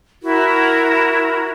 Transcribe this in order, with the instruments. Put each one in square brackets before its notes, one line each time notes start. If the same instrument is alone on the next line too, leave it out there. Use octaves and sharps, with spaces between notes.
[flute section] E4 F#4 A#4